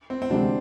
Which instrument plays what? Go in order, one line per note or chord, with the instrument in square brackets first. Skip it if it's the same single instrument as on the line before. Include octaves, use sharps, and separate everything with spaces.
[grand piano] C4
C4
[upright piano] D2 C3 E3 G#3 [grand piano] D4